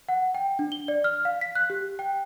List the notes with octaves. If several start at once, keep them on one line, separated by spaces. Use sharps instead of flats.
F#5
G5
D4
G7
D5
F6
F5
B6
F#6
G4
G5